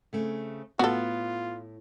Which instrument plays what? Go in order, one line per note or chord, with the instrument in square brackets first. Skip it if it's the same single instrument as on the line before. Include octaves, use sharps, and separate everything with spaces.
[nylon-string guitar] C#3 A3 C4
[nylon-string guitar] A2 [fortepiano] B3 [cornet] F4 [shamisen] F#4 A4